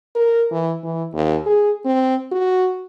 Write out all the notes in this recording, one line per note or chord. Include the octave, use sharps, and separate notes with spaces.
A#4
E3
E3
D#2
G#4
C4
F#4